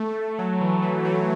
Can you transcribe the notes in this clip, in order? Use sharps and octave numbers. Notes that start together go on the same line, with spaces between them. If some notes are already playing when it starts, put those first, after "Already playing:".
Already playing: A3
F#3
E3
E3
F#3